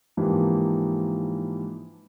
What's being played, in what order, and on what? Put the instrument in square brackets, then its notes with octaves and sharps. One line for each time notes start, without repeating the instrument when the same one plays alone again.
[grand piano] G#2 E3 F3 A#3 D4 G4